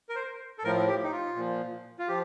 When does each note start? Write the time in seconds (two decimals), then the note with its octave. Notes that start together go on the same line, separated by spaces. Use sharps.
0.09 A#4
0.16 C5
0.58 A4
0.64 A2 F3 A#4
0.88 G4
1.03 D#4
1.12 F4
1.36 A#2 F3
1.99 F4
2.08 F3 G4